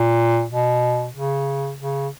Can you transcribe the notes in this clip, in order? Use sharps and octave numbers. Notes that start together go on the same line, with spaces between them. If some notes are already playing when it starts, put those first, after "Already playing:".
Already playing: A#2
B2
C#3
C#3